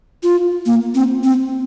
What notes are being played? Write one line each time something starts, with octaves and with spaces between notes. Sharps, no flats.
F4
A#3
C4
C4